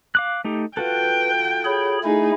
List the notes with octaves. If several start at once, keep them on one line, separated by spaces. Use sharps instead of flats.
F5 D6 F#6
A3 D#4 G4
F4 F#4 A4 B4 G5
G#4 C#5 B5
A3 D#4 E4 G#4